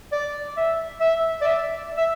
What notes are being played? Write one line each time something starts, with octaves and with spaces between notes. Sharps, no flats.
D5
E5
E5
D5
E5
E5